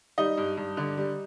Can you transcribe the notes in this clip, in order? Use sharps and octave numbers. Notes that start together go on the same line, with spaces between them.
G3 D#4 D#5
G2
G2
D3
G3